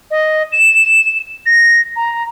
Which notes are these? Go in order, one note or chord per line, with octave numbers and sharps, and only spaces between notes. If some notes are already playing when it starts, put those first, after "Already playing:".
D#5
E7
A#6
A#5